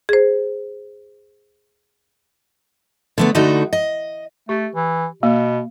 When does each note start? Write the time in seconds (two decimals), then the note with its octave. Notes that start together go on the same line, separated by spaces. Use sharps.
0.09 G#4 C5
3.18 D3 A3 B3
3.35 D3 A3 D#4 E4 F#4
3.73 D#5
4.49 A3 G4
4.75 E3
5.23 B2 A#3